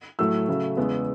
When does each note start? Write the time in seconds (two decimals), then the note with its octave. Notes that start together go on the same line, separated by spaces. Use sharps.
0.19 A2 F#3 A3 E6
0.48 C#3 F#3 A3
0.77 E2 C#3 G#3 B3